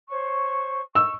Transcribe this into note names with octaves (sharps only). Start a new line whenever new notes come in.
C5 C#5 C#6
C#6 E6